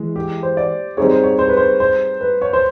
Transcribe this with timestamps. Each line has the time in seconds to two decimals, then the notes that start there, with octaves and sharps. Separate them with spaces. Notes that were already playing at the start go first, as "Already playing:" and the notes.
Already playing: E3 G#3
0.16 G4
0.43 C5
0.57 D5
0.97 G3 C4 D#4 G#4 C#5
1.11 C5
1.23 C#5
1.39 C5
1.48 B4
1.57 C5
1.80 C5
2.21 B4
2.42 C#5
2.53 C5